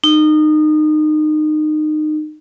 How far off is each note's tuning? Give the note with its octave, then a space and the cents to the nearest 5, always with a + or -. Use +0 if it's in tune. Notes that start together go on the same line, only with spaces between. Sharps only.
D#4 -25